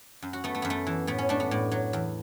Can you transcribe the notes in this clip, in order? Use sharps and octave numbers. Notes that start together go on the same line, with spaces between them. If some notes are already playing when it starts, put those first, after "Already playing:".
F#2
F#4
A3 B3
A3
F#2 B3
A3
E3
A2 B3
C#4
A3 D4
B3
A2
F#3
E2